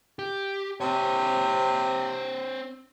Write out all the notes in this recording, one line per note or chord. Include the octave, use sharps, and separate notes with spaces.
G4
C3 C4 C#5